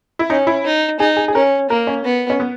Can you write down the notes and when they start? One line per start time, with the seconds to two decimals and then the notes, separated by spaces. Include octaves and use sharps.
0.19 E4
0.30 C#4 D#4
0.47 E4
0.65 D#4
1.00 D#4 G#4
1.17 G#4
1.28 G#4
1.34 C#4 A#4
1.70 A#3 A#4
1.87 C#4
2.05 B3
2.30 C#4
2.40 B3